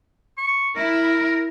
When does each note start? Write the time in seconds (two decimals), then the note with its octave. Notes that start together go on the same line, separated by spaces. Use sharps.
0.38 C#6
0.76 E4 A#4